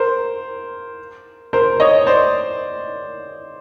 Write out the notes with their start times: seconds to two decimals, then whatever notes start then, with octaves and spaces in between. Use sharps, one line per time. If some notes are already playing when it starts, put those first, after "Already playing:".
Already playing: A#4 C5
1.53 A#4 C5
1.80 C#5 D#5
2.06 C5 D5